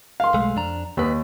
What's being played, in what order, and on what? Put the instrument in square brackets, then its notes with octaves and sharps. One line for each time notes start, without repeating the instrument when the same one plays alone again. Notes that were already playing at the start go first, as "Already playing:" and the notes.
[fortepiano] F5 C6
[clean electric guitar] B1 G#3 A3
F2 D4 A#5
[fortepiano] D#2 [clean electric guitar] D#3 B4